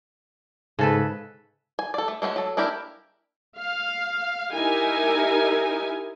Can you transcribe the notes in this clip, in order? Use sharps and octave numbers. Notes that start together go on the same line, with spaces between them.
G#2 C#3 A4 B4
G#5
A4 D5
A3
G#3 A3 C#4 F#4
F#3 A4
A#3 D4 E4 G4 A#4
F5
D#4 E4 G4 A#4 G#5